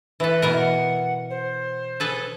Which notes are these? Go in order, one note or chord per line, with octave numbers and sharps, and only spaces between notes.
E3 A4 B4
B2 E3 A#4
F#5
C5
G#4 A4 B4